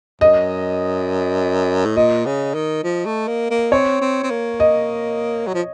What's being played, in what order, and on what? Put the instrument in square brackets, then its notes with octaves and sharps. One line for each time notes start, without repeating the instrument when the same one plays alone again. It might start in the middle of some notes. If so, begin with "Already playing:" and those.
[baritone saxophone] F#2 [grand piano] D#5
[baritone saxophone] A2
[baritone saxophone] A#2 [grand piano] D#5
[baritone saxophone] C#3
D#3
F3
A3
A#3
A#3
[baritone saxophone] C4 [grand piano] C#5
[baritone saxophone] C4
C4
A#3
[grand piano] D#5
[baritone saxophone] F#3
F3